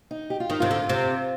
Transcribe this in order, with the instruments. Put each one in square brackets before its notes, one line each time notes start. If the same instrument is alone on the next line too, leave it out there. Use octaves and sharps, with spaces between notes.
[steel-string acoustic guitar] D#4
G4
F4
[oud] D#3 [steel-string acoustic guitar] D#4
[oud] C3 [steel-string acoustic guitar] F4
[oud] D3
C3